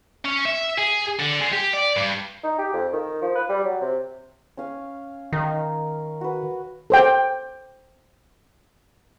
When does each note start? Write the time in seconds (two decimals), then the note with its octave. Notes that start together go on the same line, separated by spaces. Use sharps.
0.25 C#4
0.46 E5
0.78 G#4
1.19 D3
1.40 G#3
1.52 G4
1.73 D5
1.96 G2
2.44 D#4
2.59 G4
2.74 F2
2.93 D#3
3.22 F3
3.36 B4
3.49 G3
3.64 F#3
3.82 C3
4.57 C#4 F5 G#5
5.33 D#3 A#4 F5
6.21 F#4 B4
6.90 A4 C5 G5